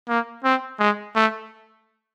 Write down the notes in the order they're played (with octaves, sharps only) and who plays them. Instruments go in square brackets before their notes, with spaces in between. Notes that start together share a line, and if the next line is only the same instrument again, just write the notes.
[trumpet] A#3
C4
G#3
A3